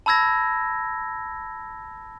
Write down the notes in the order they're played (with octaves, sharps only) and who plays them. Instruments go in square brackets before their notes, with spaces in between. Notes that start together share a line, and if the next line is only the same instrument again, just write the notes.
[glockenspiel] A5 B5 E6 G#6 A#6